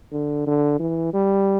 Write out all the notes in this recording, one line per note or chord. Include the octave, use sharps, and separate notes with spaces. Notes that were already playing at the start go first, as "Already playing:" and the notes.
D3
D3
E3
G3